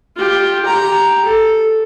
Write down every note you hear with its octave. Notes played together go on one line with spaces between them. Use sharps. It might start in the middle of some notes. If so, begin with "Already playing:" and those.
F4 G4
G4 A#5
A4